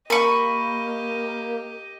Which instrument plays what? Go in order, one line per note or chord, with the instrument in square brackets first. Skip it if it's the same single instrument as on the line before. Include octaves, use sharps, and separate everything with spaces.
[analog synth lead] A#3 [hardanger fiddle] G4 D#5 [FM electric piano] A#4 [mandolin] B5 C#6